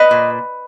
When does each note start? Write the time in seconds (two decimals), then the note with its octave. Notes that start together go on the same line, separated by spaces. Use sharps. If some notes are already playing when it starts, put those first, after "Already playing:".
Already playing: B4 D#5
0.11 A#2